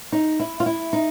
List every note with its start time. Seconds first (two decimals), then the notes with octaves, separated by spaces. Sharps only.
0.12 D#4
0.40 E4
0.60 F4
0.66 E4
0.93 D#4